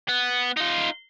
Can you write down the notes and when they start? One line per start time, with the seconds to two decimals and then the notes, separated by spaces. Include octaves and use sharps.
0.09 B3
0.57 D#4 F4